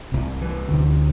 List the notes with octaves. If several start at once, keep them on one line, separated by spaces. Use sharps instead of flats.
C2 C3
E3
D2 C3